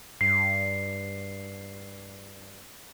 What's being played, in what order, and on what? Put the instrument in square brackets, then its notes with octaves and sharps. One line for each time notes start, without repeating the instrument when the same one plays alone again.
[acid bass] G2 [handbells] C7